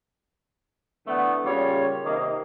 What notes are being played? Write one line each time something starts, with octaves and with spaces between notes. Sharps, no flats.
D3 E3 A3 B3
A#2 C#3 G3 F4 C#5
C3 D#3 A#3 D#5